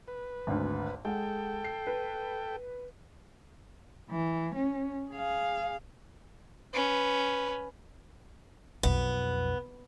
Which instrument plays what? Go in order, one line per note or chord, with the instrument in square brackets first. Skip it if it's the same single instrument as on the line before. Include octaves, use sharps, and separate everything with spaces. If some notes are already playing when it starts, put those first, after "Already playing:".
[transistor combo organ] B4
[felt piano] G#1 D2
[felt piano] G#3 F#5 [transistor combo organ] A4 G5
[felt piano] C7
B4
[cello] E3
C#4
G#4 F5
[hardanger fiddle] C#4 B4
[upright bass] B1 F2 [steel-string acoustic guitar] B3